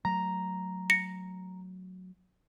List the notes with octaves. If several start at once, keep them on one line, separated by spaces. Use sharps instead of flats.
F#3 A3 A#5
A#6 C#7